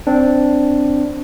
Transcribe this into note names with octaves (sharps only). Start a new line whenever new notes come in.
C4 D4